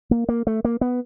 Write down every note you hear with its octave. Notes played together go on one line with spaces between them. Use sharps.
A#3
A#3
A3
A#3
B3